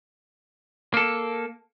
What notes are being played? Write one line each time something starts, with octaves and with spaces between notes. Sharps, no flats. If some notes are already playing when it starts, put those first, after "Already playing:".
A#3 A4